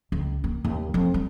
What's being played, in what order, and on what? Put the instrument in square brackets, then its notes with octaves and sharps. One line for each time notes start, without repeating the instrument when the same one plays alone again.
[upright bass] C#2
A#3
D#2
F2
G3